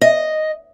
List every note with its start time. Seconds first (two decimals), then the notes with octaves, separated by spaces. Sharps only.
0.01 D#5